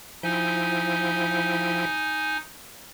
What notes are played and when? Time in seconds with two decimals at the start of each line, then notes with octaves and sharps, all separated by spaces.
0.23 F3 D#4 E4 G5 G#5